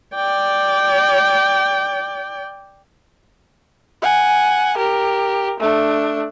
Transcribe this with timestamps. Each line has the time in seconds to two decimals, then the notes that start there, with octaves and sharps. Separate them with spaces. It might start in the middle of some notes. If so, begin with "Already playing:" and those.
0.15 D5 G5
4.02 F#5 G#5
4.77 G4 A#4
5.60 A3 D4